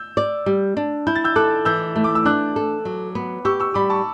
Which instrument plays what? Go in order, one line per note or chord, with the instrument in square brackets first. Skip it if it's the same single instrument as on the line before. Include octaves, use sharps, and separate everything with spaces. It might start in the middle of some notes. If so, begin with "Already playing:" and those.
Already playing: [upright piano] E6 G6
[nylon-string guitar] D5
G3
D4
[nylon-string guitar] E4 [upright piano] G6
[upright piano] A6
E6 G6
[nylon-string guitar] A4 [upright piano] D6 F#6
[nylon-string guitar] E3 [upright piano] E6 G6
[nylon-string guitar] A3
[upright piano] D6
E6
[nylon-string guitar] D4 [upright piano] D6 F#6
[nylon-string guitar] A4
F#3
B3
[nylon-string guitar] G4 [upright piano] C#6 E6
[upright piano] C#6 E6
[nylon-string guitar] G3 [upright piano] B5 D6
[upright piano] A5 C#6